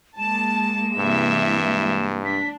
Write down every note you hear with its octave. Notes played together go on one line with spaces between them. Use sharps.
G#3 A#3 A5 E7
G2 C3 E3 E5
D4 B6